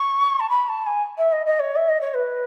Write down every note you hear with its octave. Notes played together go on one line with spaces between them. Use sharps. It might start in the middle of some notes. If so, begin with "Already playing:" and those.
Already playing: C#6
A5
B5
A5
G#5
E5
D#5
D#5
C#5
E5
D#5
C#5
B4